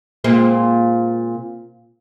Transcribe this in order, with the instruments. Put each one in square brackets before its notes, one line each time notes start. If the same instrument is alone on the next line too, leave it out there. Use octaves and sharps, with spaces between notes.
[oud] A#2 G#3 C4